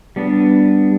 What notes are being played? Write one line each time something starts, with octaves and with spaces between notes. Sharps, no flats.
G3 B3 D4